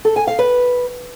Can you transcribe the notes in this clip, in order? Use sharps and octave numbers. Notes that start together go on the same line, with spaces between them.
A4
G#5
F5
B4